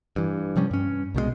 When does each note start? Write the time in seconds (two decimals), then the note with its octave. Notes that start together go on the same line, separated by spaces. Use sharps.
0.16 G2 E3
0.56 C3 F3 G3 C#4
0.71 G2 C#4
1.14 C2 B2 D#3 G#3